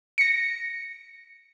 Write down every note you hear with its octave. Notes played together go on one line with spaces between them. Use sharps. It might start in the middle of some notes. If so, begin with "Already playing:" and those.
A#6 C#7